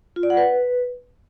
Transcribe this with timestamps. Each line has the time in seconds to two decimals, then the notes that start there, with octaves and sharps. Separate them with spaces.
0.16 F4
0.23 D5
0.30 F#5
0.37 B4